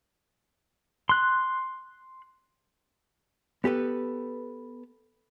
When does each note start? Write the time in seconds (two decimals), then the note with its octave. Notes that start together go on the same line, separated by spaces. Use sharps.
1.09 C6 F#6
3.64 B3 G4 A4 B4